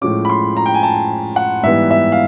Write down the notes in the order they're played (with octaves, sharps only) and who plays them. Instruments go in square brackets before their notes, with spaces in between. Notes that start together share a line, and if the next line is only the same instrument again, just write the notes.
[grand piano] A2 F3 G#3 C#4 D6
B5
C6
A#5
G5
G#5
A5
F#5
G#2 E3 G3 B3 E5
E5
F5